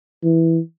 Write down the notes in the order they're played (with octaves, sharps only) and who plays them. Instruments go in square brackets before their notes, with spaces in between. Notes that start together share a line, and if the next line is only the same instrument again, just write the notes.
[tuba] E3